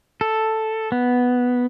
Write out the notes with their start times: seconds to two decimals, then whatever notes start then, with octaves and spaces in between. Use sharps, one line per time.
0.21 A4
0.92 B3